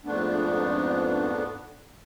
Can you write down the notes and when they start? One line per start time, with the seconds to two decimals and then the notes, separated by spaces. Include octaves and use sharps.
0.05 F2 G#2 A3 B3 D4